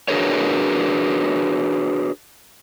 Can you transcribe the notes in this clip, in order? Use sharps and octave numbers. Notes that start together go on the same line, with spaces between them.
D4 F#4 G#4 A#4 B4 C#5